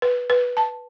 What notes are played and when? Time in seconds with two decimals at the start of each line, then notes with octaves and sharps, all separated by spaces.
0.02 B4
0.30 B4
0.57 A5